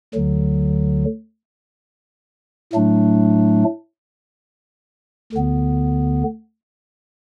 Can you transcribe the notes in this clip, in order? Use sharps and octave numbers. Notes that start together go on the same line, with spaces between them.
D2 D3 F#3
A2 F#3 A3 D4
D2 D3 B3